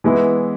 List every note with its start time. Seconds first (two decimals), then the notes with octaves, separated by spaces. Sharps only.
0.04 E3 G#3 B3 E4